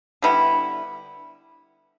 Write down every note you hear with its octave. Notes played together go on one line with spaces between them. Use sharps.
D3 G3 B3 E4